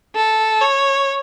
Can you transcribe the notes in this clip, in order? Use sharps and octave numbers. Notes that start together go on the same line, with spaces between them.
A4
C#5